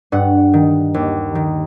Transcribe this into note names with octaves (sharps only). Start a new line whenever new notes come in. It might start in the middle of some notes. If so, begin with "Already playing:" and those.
G2 F#5
D#3
D#2
D#3